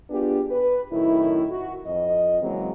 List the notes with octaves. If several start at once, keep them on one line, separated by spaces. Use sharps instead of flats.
B3 D4 F4 G4 G#4 B4
B4
F#2 A2 D#3 E4
F#4
F2 D#5
C#3 E3 F#3 G#3 A#3 C4